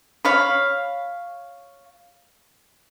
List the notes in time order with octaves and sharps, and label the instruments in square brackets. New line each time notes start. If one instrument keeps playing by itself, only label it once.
[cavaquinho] C#5 F5 B5